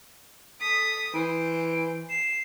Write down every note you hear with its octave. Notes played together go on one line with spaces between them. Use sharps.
A4 D#6 B6
E3 C5 D7
C7 E7